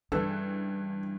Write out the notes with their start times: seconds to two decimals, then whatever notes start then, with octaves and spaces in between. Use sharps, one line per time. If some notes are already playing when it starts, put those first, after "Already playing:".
0.12 G2 C#3 E3 G3 A4 B4